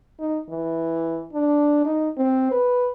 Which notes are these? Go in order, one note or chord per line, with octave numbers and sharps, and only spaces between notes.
D#4
E3
D4
D#4
C4
B4